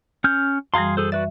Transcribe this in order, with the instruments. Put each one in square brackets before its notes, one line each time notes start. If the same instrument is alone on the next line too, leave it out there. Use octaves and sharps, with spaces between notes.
[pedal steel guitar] C#4 F6 G6
[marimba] F#2 E3 G3 [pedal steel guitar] G#4 F5 C6
[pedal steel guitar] G#4 A4 C5
[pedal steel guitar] F#4 B4 D5 [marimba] E5